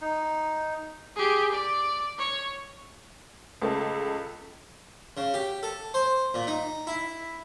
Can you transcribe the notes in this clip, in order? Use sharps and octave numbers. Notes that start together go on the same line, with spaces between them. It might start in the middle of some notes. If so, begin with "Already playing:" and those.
D#4
G4 G#4
D5
C#5
C#2 A3 A4
C#3
G4
A4
C5
A#2
D#4
E4